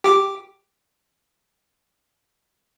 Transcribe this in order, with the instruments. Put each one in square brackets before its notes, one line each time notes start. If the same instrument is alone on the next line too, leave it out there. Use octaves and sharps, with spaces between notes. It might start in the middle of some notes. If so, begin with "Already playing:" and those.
[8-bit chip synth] G4 D6